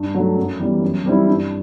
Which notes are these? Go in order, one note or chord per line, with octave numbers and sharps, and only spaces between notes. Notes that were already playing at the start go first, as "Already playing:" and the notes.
Already playing: G2
F#3 A3
F#2
E3 G3 B3
F#2
E3 G3 C4 E4
G2